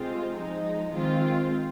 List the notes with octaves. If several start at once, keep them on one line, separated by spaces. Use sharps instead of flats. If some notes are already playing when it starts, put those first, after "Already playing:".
Already playing: C3 G#3 C4 F4
F3 G#3 D#4
D#3 G#3 C4 F4